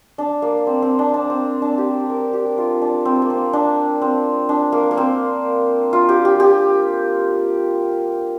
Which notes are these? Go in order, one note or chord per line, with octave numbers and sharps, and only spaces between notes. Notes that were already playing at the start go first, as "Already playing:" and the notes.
D4
A#3
C4
C4
D4
D4
C4
D4
G4
A#4
G4
F4
D4
C4
A#3
C4
D4
C4
D4
A#3
A#3
C4
F4
G4
G4
G4